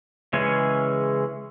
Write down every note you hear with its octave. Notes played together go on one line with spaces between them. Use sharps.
C#3 E3 G#3 C#4 G#5